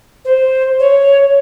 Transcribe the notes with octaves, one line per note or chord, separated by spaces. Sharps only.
C5
C#5